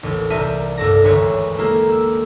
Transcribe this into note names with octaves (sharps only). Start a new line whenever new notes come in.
A1 D#2
C2 G3 A#4 E5 A5 D#7
A1 G2 A3 A4 D5 A#6
G#1 D2 B4 C#5 B5
G#3 A#3 E4 G4 A4
E6